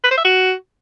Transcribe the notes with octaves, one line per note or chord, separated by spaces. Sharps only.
B4
C5
E5
F#4